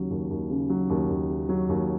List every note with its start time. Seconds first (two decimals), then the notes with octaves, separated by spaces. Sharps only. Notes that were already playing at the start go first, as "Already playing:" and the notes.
Already playing: D#2 C#3 F#3
0.10 D#2
0.30 D#2
0.50 C#3
0.69 F#3
0.89 D#2
1.09 D#2
1.29 C#3
1.49 F#3
1.69 D#2